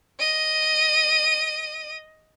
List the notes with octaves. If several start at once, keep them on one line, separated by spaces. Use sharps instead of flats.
D#5 D#7